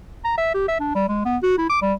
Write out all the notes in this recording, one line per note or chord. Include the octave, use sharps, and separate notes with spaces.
A#5
E5
G4
E5
D4
G3
G#3
B3
F#4
E4
D6
G3